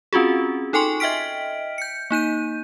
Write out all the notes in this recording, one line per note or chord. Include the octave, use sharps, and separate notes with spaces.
C4 C#4 F4 F#4 G#4
D#4 A4 G5 G#5 C6 C#6
D#5 E5 G5 F6 B6 D7
G6 C#7
A#3 D#4 G6 D#7